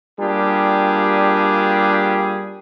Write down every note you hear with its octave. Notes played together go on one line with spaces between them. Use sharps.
G3 A#3 D4 F4 G4 G#4